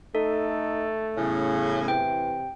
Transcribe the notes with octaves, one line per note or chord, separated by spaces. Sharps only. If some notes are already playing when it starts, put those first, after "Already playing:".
A3 D#4 A4
E2 A2 C#3 C#4
C3 E3 G5